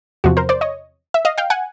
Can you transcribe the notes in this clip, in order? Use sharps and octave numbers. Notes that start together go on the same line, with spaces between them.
E2 C3 F3 F#4
A#4 C5
C5 D5
C#5 D#5
E5
D#5 F5
F5 G5
F#5 G#5